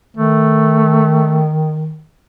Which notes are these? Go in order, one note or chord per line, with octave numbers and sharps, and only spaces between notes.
D#3 A3